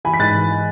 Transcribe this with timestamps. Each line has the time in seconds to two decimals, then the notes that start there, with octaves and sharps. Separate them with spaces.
0.05 E3 G#5 B5
0.14 B6
0.19 G#2 F#6 A6
0.35 E3